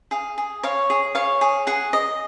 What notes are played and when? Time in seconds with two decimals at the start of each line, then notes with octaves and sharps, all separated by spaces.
0.11 G#4 F5
0.38 G#4
0.63 C#5 F5
0.90 G#4
1.15 C#5 F5
1.41 G#4
1.67 G#4 F#5
1.93 D#5